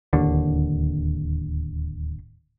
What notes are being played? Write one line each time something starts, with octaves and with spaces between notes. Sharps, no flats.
D1 D#2 D3